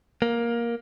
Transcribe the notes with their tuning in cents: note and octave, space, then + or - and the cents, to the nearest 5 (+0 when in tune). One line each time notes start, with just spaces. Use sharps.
A#3 +10